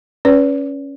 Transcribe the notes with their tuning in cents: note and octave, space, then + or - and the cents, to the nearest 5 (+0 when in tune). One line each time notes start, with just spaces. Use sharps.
C#4 +0 B4 +0 D5 -40